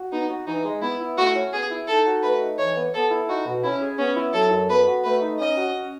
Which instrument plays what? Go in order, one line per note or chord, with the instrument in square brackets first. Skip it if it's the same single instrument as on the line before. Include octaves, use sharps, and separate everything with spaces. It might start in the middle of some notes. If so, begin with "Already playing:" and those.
Already playing: [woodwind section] F#4
[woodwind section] B3 [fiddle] D#4
[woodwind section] F#4
[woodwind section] E3 [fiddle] D#4
[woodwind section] G#3
[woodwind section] B3 [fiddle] E4
[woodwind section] E4
[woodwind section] A3 [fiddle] F#4
[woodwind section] C#4
[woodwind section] B3 [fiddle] G#4
[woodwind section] E4
[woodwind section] D#4 [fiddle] A4
[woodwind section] F#4
[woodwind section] A3 [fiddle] B4
[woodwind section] D#4
[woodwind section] E3 [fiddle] C#5
[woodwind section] B3
[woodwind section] B3 [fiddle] A4
[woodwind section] E4
[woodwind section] D#4 [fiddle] F#4
[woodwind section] B2
[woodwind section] C#4 [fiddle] E4
[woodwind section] G#4
[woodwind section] B3 [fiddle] C#4
[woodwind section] E4
[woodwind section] F#3 [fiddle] A4
[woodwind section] F#2
[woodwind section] B3 [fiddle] B4
[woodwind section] F#4
[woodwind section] A3 [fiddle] B4
[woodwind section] D#4
[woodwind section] C#4 [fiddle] D#5
[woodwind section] F#4
C#4